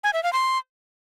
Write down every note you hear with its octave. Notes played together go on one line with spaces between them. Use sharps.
G#5
E5
F5
C6